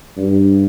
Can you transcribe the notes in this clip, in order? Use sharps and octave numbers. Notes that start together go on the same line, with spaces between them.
G2